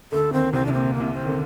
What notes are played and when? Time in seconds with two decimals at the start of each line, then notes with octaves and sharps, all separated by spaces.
0.12 D2 D3 A4
0.32 D#2 D#3 C4
0.53 C2 C3 C4
0.66 C3 D4
0.73 A#2 C4
0.94 A#3
1.00 C2 C3
1.13 C4
1.23 D#3
1.27 D3